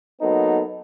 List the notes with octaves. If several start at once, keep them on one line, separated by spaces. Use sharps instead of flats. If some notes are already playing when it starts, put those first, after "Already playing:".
F#3 A#3 B3 D#4 A4